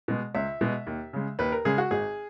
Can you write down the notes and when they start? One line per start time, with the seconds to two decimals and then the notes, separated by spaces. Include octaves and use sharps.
0.08 B2 G#3
0.35 C#2 E5
0.61 B2 G#3
0.87 D#2
1.13 C#3 G#3
1.39 D#2 B4
1.52 A#4
1.65 C#3 G#3 G#4
1.78 F#4
1.91 G#1 G#4